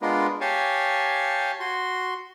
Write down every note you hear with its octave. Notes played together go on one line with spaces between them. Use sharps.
G#3 B3 D4 F4 A#4
G4 C#5 F5 G#5 A5
F#4 C6